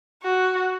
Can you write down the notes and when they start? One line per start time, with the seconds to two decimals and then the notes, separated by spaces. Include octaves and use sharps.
0.23 F#4